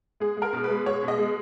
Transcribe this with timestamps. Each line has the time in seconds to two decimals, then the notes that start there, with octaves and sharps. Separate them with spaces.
0.20 G#3 G#4
0.37 G#3
0.42 A#4
0.53 B2
0.64 B4
0.70 G#3
0.86 G#3 C#5
1.03 B2
1.08 D#5
1.18 G#3